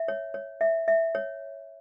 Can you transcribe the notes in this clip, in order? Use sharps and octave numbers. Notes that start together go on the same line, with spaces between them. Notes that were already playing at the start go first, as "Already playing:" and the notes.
Already playing: E5
C#5
C#5
E5
E5
C#5